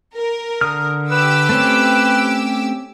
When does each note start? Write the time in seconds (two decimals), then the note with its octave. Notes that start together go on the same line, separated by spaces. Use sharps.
0.17 A#4
0.61 D3 D#6 F6
1.11 G4 B4 D6 E6
1.49 A3 C4 C#4